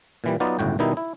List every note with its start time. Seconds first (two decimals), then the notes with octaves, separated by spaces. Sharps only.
0.24 A#2 E3 G3
0.40 F#3 B3 D#4 F4 D5
0.59 G1 C#2 A2 F#4 G5
0.79 B2 D#3 G3 D#4 E4
0.97 E4